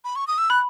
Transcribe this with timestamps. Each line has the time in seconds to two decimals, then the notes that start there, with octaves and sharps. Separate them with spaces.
0.04 B5
0.16 C#6
0.27 D#6
0.38 E6
0.50 B5 F#6